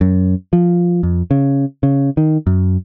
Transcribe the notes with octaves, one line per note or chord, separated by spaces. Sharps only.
F#2
F3
F2
C#3
C#3
D#3
F#2